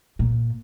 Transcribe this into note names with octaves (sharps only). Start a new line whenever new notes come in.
A#2